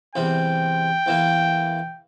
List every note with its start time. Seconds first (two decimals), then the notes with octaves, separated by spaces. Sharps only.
0.15 E2 C3 G3 G5
1.06 E2 E3 A#3